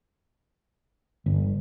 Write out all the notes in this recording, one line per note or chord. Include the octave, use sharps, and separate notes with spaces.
G1